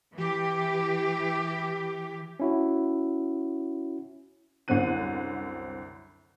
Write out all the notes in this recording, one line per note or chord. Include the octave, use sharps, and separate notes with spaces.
E3 G4
C#4 E4 F#4
C2 F#2 D3 C4 F#6 D#7